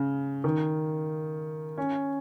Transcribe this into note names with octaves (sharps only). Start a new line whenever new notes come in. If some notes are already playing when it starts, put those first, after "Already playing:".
Already playing: C#3
D#3
C#4